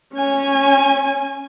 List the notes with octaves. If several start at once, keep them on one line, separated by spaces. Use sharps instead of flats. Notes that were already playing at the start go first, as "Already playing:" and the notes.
C#4 G#5